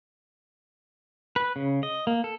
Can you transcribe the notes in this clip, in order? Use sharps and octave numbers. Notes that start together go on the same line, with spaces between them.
B4
C#3
D#5
A#3
A4